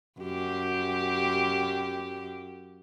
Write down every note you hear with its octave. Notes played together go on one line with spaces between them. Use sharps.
F#2 G4